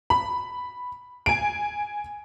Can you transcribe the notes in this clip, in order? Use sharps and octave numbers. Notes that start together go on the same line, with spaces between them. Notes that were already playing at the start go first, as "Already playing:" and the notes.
B5
G#5 D7